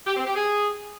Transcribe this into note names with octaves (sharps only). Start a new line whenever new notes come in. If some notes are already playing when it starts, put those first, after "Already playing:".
G4
C4
G4
G#4